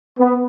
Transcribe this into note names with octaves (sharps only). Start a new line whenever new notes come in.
B3